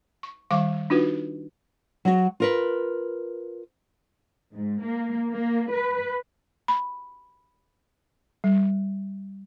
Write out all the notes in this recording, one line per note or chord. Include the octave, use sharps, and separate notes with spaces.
C#6
D#3 G3 F5 C#6 D6
D4 D#4 F4 F#4 B4
F#3 F#4
F4 A#4 B4
G#2
A#3
A#3
B4
B5
G3